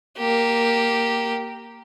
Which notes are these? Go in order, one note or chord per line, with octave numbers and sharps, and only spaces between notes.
A#3 G4